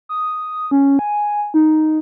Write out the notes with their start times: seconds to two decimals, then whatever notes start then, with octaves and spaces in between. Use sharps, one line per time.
0.09 D#6
0.71 C#4
0.99 G#5
1.54 D#4